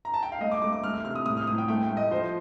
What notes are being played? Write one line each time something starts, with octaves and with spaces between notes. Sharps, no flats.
A#5
A5
G5
F5
A3 D#5
D6
A3 D6
D6
A3 F6
F6
C3 F6
D#6
A2 D#6
F6
A2 D#6
G5
A3 G5
G5
A3
D#5
F3 C5